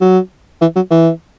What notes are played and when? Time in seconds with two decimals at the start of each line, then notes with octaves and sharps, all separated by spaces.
0.01 F#3
0.61 E3
0.76 F#3
0.91 E3